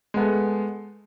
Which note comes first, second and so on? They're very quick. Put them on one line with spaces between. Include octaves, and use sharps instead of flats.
G#3 B3 A3